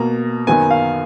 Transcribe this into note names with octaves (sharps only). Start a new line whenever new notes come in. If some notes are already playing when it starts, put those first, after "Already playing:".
Already playing: B2 A#3 A#5
F#2 D#3 F#3 B3 G#5
F5